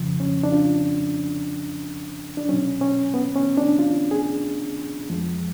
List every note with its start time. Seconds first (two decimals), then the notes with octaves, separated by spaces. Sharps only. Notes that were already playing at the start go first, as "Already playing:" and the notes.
Already playing: F2 C#3 F3
0.20 C#4
0.43 D4
0.52 F4
2.37 D4
2.49 B2 F#3 C#4
2.81 C#4
3.14 B3
3.36 C#4
3.57 D4
3.79 F4
4.11 G#4
5.10 F2 F3 G#3